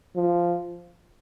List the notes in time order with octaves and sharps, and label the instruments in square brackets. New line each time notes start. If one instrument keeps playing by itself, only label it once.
[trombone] F3